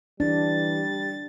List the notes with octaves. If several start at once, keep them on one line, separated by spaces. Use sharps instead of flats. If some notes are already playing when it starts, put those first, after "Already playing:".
E3 G3 D4 A6